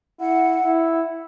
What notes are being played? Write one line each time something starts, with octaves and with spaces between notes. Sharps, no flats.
E4 F#5
E4